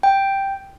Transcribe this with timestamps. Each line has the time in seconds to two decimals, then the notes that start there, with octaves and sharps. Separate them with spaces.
0.03 G5